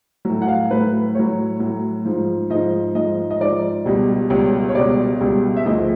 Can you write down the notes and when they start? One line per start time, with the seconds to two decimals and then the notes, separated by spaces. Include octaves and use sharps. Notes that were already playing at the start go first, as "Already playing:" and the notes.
0.25 A2 F#3
0.42 F#5
0.48 F5
0.70 A2 F#3 B4
1.15 A2 F#3 C#5
1.60 A2 F#3
2.05 G#2 F3
2.50 G#2 F3 D#5
2.95 G#2 F3 D#5
3.30 D#5
3.40 G#2 F3 D5
3.86 C#2 B2 G3
4.30 C#2 B2 G3 C#5
4.69 C#5
4.75 C#2 B2 G3 D5
5.21 C#2 B2 G3
5.56 E5
5.65 D2 C#3 F3 D#5